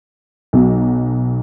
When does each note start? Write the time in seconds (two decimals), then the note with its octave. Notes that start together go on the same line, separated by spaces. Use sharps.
0.53 B1 B2 F#3